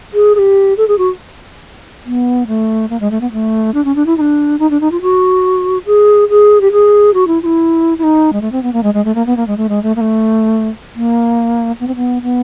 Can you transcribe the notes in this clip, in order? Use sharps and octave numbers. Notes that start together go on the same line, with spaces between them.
G#4
G#4
G4
A4
G#4
F#4
B3
A3
A#3
G#3
A3
B3
A3
D4
C#4
D4
E4
D#4
D4
D#4
D4
D#4
F4
F#4
G#4
G#4
G4
G#4
F#4
E4
F4
E4
E4
D#4
G#3
A3
C4
B3
A#3
G#3
G#3
A3
A#3
B3
A#3
G#3
A3
G#3
A3
A#3
A3
A#3
B3
C4
B3
B3